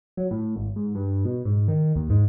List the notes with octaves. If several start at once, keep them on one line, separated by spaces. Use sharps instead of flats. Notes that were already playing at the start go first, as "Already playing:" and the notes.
F#3
A2
G#1
G#2
G2
B2
G#2
D#3
D#2
G#2